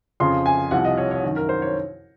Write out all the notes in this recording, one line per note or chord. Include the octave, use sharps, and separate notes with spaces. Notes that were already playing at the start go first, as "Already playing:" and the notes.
F2 C#3 F3 C6
G#5
C2 C3 F3 F#5
D#5
C#5
C#5
F#2 D#3
A#4
C5
C#5